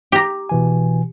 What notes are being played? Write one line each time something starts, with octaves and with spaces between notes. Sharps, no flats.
G4 A#5
B2 E3 G#5